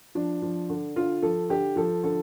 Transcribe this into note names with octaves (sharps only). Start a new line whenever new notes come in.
F3 D4
F3
D3
D3 F4
F3 A4
D3 G4
F3 A4
D3 A4